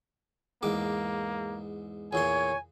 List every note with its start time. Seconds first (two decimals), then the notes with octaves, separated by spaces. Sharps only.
0.63 E2 G#2 A#3 D6
2.13 E2 A#2 C#5 G#5 C6